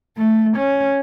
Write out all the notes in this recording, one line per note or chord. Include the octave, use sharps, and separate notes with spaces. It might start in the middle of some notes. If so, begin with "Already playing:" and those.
A3
C#4